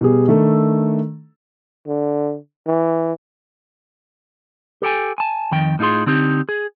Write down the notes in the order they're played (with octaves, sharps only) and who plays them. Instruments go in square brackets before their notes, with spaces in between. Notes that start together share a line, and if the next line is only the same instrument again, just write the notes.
[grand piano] B2 G3 G#4
D#3 A3 D4 A4
[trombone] D3
E3
[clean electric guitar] G4 A4 G5 G#5
G#5 A5
F2 D#3 G5
A2 D#4 F4 G#4 C6
D3 C4 D#4 G4
G#4